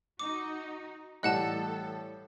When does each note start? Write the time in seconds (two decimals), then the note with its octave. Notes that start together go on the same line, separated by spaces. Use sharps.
0.19 D#4 F#4 D6
1.23 A2 E3 G3 A4 D#5 F#5 A5 F#6